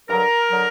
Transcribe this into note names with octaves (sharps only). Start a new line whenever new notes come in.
G2 D3 F#3 A#4
D3 F#3